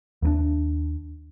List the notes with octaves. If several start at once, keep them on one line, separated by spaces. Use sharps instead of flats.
D#2 A#3 D4